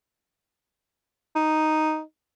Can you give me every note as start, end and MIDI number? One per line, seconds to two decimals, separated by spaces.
1.35 2.01 63